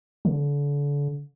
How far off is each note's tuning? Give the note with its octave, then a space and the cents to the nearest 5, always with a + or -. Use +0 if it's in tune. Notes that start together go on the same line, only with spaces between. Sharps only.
D3 -35